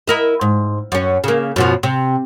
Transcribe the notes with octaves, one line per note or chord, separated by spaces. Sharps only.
E4 A#4 D#5
G#2
F#2 C#4
C#3 A#3
F#2 B2 F3
C3